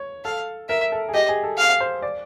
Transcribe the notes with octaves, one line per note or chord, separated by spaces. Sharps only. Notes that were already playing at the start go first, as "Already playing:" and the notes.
Already playing: C#5
A4 F5
A#4 E5
A4
G#4
G4 D#5
G#4
A4
F5
C5
D5